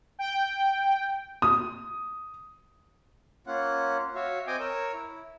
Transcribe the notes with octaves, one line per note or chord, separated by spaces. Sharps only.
G5
D#6
A#3 C#4 F4 F#5
F#4 C#5 E5 F5
C4 D#5 G5 G#5 D6 D#6
A#4 C#5 E6
E4